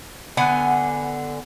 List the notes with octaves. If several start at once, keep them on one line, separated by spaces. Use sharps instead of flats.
D3 B3 F#5 G#5